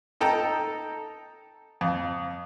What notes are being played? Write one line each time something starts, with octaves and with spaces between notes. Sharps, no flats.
D#4 A4 G5 A#5
F2